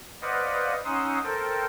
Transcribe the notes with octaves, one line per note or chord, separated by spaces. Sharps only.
B4 C5 D5 D#5 F5 F#5
C#4 D#4 F#5 C6 D#6 E6
A4 A#4 C5 G5